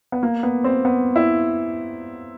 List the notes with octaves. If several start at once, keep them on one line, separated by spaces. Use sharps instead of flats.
B3
A#3
B3
C4
B3
E4